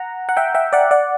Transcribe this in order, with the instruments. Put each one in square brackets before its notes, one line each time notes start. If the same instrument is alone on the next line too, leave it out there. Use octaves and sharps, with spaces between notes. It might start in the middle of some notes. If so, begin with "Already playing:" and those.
Already playing: [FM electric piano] F#5 A#5
F#5
E5 G5
E5 G5
D5 F#5
D5 F#5